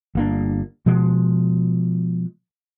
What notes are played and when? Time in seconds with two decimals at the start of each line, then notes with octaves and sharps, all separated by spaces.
0.15 G1 A#3 D4
0.86 B2 F3 G#3